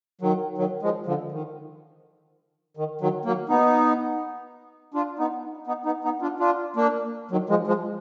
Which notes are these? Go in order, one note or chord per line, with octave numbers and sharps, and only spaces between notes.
D#3 F#3
D#3 F#3
F3 G#3
D3 F3
D#3
D#3
D#3 F#3
F#3 A#3
B3 D#4
D4 F4
B3 D#4
B3 D#4
B3 D#4
B3 D#4
D4 F4
D4 F4
A#3 D4
D#3 F#3
F3 G#3
F3 G#3